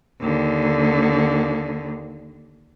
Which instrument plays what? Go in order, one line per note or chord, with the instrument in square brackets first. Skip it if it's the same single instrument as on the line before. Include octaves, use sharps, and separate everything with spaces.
[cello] D#2 D3